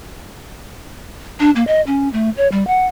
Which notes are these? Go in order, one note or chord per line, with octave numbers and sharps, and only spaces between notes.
D4
A#3
D#5
C#4
A3
C#5
G3
F#5